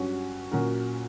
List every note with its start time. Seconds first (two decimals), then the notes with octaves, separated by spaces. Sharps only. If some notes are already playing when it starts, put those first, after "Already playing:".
Already playing: G2 F#3 C#4 F#4 C#5
0.52 A#2 F#3 C#4 F#4 A#4